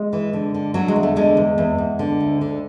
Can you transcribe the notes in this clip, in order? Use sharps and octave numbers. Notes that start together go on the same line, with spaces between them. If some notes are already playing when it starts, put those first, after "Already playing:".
Already playing: G#3
E3
D3
D3
D3 F#3
G#3
E2
A3
D3 G#3
E2
E2
E2
D3
D2
D3